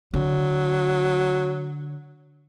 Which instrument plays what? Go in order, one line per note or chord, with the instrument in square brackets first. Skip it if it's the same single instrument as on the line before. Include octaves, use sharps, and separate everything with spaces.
[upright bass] D3 [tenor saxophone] F#3